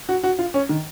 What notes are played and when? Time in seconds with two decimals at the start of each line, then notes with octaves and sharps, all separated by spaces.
0.09 F#4
0.23 F#4
0.39 F4
0.54 C#4
0.69 D#3